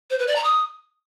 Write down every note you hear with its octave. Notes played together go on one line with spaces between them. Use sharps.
C5
B4
D5
A#5
D#6